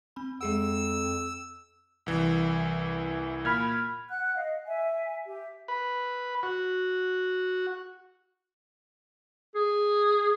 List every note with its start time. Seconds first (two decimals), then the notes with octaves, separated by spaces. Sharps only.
0.16 C4 B5
0.41 F2 G#3 G#4 F#5 E6
2.06 C2 E3
3.45 A#2 B5 F6 G#6
4.09 F#5 F#6
4.35 D#5 F5
4.66 E5 G#5
5.26 G4 E5
5.68 B4
6.43 F#4
9.55 G#4